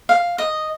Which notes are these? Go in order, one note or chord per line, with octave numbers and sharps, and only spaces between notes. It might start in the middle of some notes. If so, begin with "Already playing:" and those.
F5
D#5